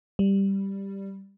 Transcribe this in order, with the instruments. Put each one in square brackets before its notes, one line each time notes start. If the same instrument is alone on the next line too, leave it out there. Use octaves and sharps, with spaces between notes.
[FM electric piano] G3